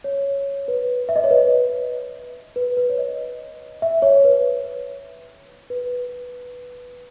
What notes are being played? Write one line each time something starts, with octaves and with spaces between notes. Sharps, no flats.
C#5
B4
E5
D#5
C#5
B4
B4
B4
C#5
D#5
E5
C#5
B4
B4